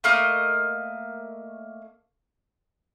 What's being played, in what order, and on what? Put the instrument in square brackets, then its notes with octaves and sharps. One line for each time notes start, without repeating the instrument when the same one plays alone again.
[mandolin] A3 A#3 D#5